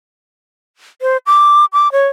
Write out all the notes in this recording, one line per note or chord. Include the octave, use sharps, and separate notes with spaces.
C5
D6
D6
C#5